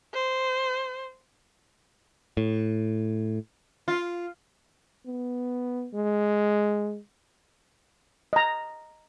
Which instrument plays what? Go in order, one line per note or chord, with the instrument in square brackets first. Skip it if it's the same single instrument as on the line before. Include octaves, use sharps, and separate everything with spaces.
[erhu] C5
[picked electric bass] A2
[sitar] F4
[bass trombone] B3
G#3
[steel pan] D#5 A#5